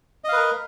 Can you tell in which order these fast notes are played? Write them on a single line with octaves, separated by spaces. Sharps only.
D#5 F5 B4 A#4